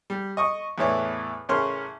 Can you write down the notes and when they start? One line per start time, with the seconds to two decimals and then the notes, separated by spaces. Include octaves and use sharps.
0.10 G3
0.37 D#5 C#6 D#6
0.78 E2 A2 E3 C#5 D5
1.49 A1 C#3 A#4 C#5 C6 F6